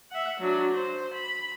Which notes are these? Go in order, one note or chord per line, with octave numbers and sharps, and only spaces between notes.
E5 F#5
F#3 D4
C5
B5